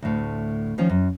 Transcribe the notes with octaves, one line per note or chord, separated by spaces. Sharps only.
D2 A2
D#3 F3 C#4
F#2